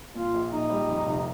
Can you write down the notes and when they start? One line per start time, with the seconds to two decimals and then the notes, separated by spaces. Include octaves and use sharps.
0.15 A#2 F4
0.34 A#1
0.52 A#1 D#4
0.70 G3
0.88 F2
1.07 F1